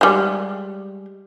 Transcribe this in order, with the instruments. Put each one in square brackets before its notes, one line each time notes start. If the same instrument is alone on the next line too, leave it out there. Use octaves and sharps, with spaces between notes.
[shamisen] G3 G#3